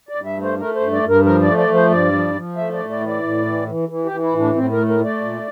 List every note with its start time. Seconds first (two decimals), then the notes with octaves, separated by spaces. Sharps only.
0.09 D5
0.15 G2
0.26 E5
0.37 A3
0.43 C5
0.59 A3 A#4
0.75 C5
0.80 G2
0.92 D5
1.03 G2
1.08 A#4
1.25 F3 A#4
1.42 A3 D5
1.58 D5
1.68 F3
1.74 C5
1.91 G2 D5
2.12 F3
2.34 F3
2.57 A3 E5
2.73 D5
2.79 A2
2.90 D5
3.01 E3
3.06 D5
3.23 A2
3.45 E3
3.67 E3
3.89 E3
4.05 G4
4.11 E3
4.22 E4
4.33 A2
4.39 D4
4.54 A2 C4
4.71 A#4
4.77 A3
4.88 A#4
4.99 A3 D5
5.21 A#2